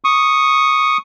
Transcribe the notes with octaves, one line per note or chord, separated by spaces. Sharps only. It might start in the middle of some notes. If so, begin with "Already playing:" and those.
C#6 D#6